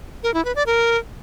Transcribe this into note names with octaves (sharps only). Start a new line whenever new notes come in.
A#4
E4
B4
D5
A#4